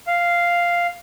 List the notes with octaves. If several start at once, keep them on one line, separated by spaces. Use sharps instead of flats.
F5